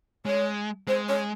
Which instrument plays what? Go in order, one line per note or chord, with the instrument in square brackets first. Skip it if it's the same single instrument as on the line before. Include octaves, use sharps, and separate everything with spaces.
[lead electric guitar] G#3 [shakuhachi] C#5
[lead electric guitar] G#3 [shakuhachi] C5
[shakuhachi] C#5